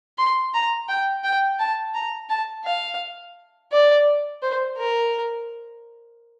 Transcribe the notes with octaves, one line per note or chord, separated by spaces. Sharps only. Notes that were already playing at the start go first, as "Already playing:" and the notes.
C6
A#5
G5
G5
A5
A#5
A5
F5
D5
C5
A#4